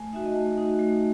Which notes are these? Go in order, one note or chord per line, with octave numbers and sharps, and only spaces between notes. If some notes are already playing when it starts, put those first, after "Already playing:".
Already playing: A3 G#5
D#4 F#4 E5
D#5
A3
D#4 F#4
A3